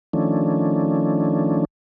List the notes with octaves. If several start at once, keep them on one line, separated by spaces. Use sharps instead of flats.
D#3 F3 A3 C#4 D4